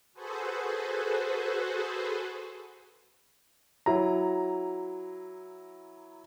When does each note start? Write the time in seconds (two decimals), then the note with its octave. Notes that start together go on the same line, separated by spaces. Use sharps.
0.13 F#4 G#4 A4 B4 C5
3.86 F#3 E4 A#5